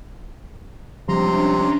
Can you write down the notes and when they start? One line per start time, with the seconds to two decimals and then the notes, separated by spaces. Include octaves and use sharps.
1.09 C3 F3 G3 G#3 C#4 D4 A#5 C6